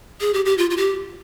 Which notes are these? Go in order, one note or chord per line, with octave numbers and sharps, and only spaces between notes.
G#4
G4
G4
F4
F4
G4